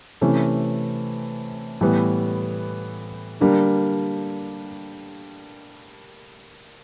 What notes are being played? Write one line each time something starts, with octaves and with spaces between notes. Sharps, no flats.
C3 E3 A3 C#4
A2 E3 G3 B3
D3 G3 A#3 D4